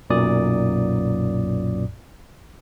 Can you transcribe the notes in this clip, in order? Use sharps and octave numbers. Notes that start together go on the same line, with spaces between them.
B1 F#2 A#2 D5 D#6